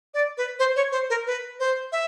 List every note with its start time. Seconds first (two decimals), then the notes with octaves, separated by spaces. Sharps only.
0.14 D5
0.37 B4
0.59 C5
0.76 C#5
0.92 C5
1.10 A#4
1.26 B4
1.60 C5
1.92 E5